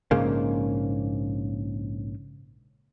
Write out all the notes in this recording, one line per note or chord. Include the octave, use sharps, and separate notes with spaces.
A#1 G#2 C#3 A#3